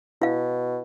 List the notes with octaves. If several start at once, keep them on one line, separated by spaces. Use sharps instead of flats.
B2 E4 F5